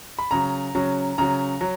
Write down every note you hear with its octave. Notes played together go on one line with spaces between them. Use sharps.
B5
C#3 F#3 A#5
C#3 F#3
C#3 F#3 A#5
F#3